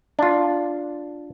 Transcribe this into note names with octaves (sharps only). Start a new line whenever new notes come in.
D4 F4